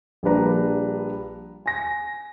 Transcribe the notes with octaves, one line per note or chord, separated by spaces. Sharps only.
A#1 G3 A#3 D4 B4 A#5
G#5 A#6